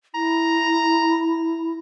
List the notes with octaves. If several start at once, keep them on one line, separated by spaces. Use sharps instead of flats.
E4 A#5